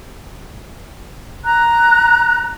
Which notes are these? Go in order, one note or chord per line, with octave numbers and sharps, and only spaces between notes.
A#5 F#6